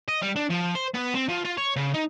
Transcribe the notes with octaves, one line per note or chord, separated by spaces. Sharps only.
D#5
G3
D4
F3
C5
B3
C4
F3
F4
C#5
C#3
D#4